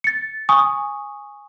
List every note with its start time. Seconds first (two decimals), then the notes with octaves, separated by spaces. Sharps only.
0.04 A6 C#7
0.49 G#5 C#6 D#6